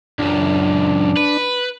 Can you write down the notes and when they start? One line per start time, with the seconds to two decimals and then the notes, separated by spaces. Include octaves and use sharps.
0.19 C#2 F#2 D4
1.17 B4